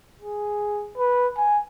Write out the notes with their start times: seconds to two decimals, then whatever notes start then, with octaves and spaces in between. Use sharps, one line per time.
0.21 G#4
0.98 B4
1.37 G#5